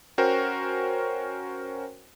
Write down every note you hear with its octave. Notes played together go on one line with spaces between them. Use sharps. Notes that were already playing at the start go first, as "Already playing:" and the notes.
C#4 F#4 A#4 C5 G5